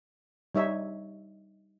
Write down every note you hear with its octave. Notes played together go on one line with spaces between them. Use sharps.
G3 D#4 C#5 E5